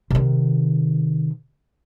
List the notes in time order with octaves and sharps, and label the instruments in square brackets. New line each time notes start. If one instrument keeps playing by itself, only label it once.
[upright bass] C3 D#3